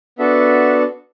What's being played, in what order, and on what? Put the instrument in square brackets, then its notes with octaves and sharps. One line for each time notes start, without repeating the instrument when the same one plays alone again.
[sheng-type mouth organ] B3 D4 F#4 A4 E5